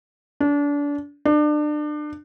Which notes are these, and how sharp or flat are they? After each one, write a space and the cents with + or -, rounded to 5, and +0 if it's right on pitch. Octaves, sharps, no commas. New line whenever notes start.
D4 -30
D4 +30